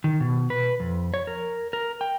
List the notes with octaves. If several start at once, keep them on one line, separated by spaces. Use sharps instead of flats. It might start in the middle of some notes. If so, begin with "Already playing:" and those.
D#3
B2
B4
F2
C#5
A#4
A#4
G5